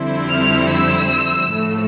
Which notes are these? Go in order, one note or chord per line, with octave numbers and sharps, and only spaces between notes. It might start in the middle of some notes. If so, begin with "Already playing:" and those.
Already playing: F2 D3 G3 C4 E4
F6
E6
A2 F3 A3